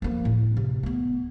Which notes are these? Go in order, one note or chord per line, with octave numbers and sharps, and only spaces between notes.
F3 A#3
A2
C3
A3 B3